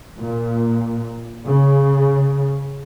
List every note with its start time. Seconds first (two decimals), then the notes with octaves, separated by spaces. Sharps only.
0.19 A#2
1.45 C#3